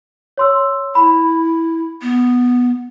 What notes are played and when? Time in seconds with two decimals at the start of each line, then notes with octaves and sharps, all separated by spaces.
0.38 C#5 C6 E6
0.95 E4 B5
2.02 B3